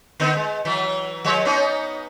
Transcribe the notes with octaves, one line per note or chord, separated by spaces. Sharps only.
D3 B3 D#4
G#3
E3 F#3
F3 G#3 C#5
B3 C#4 D#4